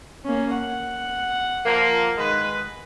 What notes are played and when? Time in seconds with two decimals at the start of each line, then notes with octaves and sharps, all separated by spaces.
0.25 A#3 C#4
0.55 F#5
1.65 F3 A#3
2.18 D#3 G#3 B4